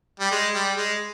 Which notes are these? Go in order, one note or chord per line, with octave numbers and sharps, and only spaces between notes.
G3
G#3
G3
G#3